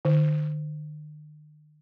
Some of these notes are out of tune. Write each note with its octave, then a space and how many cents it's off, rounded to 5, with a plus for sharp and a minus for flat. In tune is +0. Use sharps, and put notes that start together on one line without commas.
D#3 -45